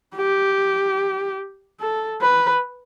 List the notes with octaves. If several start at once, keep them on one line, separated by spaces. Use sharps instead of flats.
G4
A4
B4